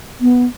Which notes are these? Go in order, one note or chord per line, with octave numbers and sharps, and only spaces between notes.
B3